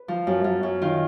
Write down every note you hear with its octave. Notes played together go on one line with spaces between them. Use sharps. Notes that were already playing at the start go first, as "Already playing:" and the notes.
Already playing: B4
F3
F#2
F#2
F#2
D#3 F4